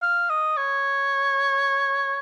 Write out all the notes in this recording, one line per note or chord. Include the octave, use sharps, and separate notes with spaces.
F5
D#5
C#5